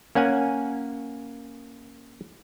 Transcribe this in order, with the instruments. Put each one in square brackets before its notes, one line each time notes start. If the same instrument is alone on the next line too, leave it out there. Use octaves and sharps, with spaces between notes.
[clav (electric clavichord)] A#3 C#4 F#5 G#5